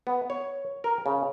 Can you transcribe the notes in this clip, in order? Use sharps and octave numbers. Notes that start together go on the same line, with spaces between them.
B3
C#5
A#4
C#3